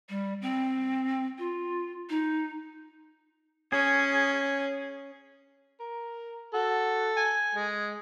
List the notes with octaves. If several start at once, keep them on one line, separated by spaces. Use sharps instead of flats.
G3
C4
F4
D#4
C#4 G#4
A#4
F#4 A4
G#5
G#3